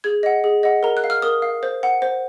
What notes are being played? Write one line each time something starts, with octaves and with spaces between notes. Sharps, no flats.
G#4 G#6
D#5 F#5
G#4
D#5 F#5
A#4 A#5
F#6
F5
F6
A#4 D#6
F5
C5
F#5
C5